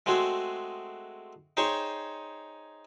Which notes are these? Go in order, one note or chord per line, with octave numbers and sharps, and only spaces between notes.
G#3 A3 C4 F#4 G#4
D#4 G#4 C5 C#5 G5 C#6